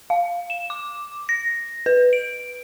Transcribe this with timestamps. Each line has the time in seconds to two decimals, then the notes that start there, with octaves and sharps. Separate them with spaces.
0.10 F5
0.50 E7
0.70 D6
1.29 A#6
1.86 B4
2.13 D7